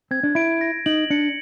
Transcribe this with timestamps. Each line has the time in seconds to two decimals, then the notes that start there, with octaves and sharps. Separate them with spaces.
0.11 C4 G#6
0.23 D4
0.35 E4 D7
0.61 A#6
0.86 D#4 F#7
1.10 D4 C#7